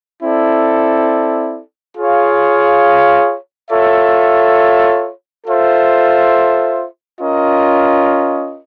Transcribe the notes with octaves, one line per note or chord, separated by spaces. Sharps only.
C4 E4 A4 D5
F4 G#4 C#5 F5
F4 A4 C#5 E5
F4 A4 C5 E5
C#4 F4 A#4 D#5